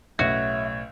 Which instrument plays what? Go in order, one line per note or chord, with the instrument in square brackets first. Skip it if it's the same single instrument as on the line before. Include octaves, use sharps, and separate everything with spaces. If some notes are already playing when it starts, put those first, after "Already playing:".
[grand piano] B1 A2 C#4 [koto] F#4 [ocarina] E5 [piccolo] G#6